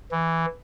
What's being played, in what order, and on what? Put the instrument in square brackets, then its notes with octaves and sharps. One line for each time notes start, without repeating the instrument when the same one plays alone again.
[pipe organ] E3